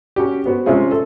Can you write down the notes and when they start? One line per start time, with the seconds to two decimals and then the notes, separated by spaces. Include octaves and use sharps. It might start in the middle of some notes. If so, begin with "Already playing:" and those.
0.16 C#4 F#4 G4
0.46 B3 F#4 C5
0.66 C3 G#3 C4 C#4 F4 G#4
0.91 A4